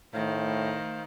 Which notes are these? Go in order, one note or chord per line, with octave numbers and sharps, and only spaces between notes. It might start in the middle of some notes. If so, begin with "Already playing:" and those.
A2 D#3 A3 C5 F5